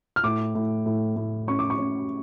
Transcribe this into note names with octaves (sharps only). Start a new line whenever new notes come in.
F6
A2 D6
A2
A2
A2
C#4 C#6
D6
C#6
C#4